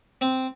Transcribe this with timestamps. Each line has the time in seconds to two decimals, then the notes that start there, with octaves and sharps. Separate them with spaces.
0.21 C4